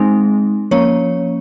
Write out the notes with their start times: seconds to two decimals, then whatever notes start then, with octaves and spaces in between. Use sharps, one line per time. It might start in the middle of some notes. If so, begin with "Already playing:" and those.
Already playing: G#3 C4 D#4
0.71 F3 A#3 C#4 C#5